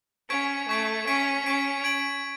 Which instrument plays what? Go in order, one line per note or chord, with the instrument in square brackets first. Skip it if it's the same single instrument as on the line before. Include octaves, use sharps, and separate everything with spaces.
[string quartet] C#4 [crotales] C#6 G#6 B6 D7
[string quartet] A3 [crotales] C#6 G#6 B6 D7
[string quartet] C#4 [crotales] C#6 G#6 B6 D7
[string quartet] C#4 [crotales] C#6 G#6 B6 D7
[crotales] G#6 D7 F#7